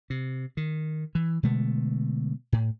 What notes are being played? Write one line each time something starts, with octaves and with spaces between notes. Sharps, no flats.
C3
D#3
E3
B2 D3 G#3 A3
A2